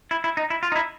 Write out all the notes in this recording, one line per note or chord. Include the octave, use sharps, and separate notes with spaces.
E4
E4
D#4
E4
F4
D#4
E4